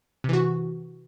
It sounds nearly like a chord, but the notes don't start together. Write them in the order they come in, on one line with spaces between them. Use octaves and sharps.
C3 E3 F#4